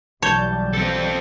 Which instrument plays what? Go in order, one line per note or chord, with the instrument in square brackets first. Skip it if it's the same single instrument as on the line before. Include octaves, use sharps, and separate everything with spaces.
[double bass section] B1 E3 G3 [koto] C#5 [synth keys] A5 G6
[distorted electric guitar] C4 A4